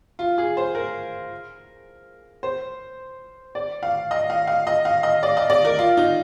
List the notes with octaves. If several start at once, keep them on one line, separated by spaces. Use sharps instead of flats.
F4
G#4
C5
A#4
C5
D5
F5
D#5
F5
F5
D#5
F5
D#5
D5
D#5
D5
A#4
F4
D#4